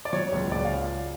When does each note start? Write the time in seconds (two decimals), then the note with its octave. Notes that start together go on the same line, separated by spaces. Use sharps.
0.05 D5
0.13 F#3 C#5
0.32 C#2
0.51 C#2 D5
0.64 F5